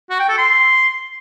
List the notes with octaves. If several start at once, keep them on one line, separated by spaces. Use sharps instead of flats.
F#4
G5
A4
C6